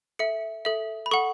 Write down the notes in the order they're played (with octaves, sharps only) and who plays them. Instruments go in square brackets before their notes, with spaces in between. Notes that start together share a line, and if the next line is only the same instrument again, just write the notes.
[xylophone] A4 E5 C#7
A4 E5
B5
A4 F#5 C#6